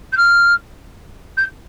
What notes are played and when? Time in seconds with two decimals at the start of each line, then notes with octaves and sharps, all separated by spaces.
0.13 G6
0.17 F6
1.37 G6